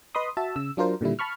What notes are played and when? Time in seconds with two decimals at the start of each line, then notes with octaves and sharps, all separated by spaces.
0.15 B4 D#5 B5 C6 D#6
0.37 F#4 E5 A5
0.56 C#3 E6
0.77 F#3 D4 F4 A#4 C5
1.01 A#2 D3 D#3 G3 E4
1.19 A5 B5 C#6 F6